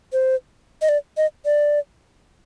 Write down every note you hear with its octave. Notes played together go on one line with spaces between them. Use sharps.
C5
D#5
D5
D#5
D5